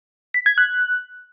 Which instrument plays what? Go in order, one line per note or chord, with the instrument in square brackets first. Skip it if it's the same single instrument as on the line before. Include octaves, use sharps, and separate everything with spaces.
[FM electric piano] B6
G#6
F#6